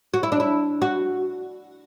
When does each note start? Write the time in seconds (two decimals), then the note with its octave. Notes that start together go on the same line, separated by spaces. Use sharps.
0.14 F#4
0.23 E4
0.32 D4
0.40 E4
0.82 F#4